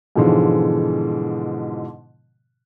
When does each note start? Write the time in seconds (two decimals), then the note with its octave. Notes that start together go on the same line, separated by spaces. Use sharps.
0.16 G#2 B2 D3 E3 F3 G#3